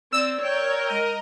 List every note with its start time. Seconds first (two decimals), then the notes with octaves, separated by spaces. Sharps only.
0.13 C4 D5 E6
0.41 A#4 C#5 G5
0.90 G#3 D#5